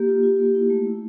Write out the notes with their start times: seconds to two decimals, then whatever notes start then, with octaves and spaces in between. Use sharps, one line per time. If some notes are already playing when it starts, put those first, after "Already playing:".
Already playing: A#3 G4
0.08 F4
0.23 F4
0.39 A#3
0.55 E4
0.70 A3
0.86 E4